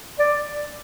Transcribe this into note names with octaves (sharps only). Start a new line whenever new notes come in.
D5